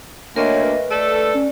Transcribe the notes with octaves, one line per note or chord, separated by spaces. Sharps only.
D2 A#3 A#4 C#5 D#5 E5
B4
A3 A4 D5
C#4